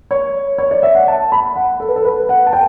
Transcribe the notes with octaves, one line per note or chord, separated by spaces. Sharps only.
C#5
C#5
D5
E5
F#5
A5
B5
F#5
A4
B4
A4
B4
F#5
A5
G5